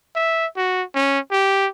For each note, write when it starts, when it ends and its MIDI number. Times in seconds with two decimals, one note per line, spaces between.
0.15 0.46 76
0.56 0.83 66
0.95 1.19 61
1.31 1.67 67